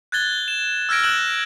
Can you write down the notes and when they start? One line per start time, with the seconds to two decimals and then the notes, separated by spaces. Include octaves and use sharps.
0.12 F#6 G#6 A6 G7
0.48 E7
0.89 E6 F6 G#6 A#6 D7
1.03 F#6 E7 F#7